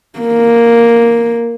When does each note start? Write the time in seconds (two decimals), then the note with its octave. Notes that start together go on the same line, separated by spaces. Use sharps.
0.19 A#3